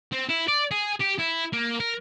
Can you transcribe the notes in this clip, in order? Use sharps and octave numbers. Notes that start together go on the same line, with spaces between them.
C4
E4
D5
G#4
G4
E4
A#3
A#4